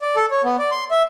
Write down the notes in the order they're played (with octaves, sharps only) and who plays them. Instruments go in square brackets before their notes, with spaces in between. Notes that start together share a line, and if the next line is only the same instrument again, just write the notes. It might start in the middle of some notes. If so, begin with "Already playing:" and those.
[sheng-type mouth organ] D5
A4
C#5
B3
D5
C6
E5